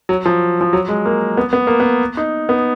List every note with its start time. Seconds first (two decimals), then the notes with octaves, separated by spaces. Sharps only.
0.09 F#3
0.26 F3
0.61 F3
0.73 F#3
0.88 G#3
1.06 A#3
1.37 B3
1.53 B3
1.67 A#3
1.80 B3
2.17 D#4
2.49 B3